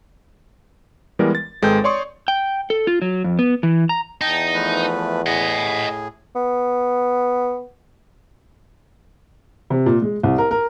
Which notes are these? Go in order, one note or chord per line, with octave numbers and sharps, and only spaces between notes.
E3 G3 G#3 B3 A#4 D5
A6
G#1 G#3 A4 B4 G5 G6
C#5 D5 C6 C#6 D#6
G5
A4
F4
F#3
F2
B3
E3
A#5
E2 D#4 G5 A5
F3 A3 B4
A2 G#4 D#5 F#5
B3
C3
A#2
G#3
C2
A#4
A#4